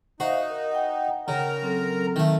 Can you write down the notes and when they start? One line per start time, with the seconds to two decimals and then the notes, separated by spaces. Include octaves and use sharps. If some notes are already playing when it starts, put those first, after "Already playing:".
0.20 D#4 F#4 C5 E5 F5
0.50 A#4
0.72 F#5 G5
1.28 C#3 A#4 A#5
1.62 F#3 C4 A4
2.16 D#3 A3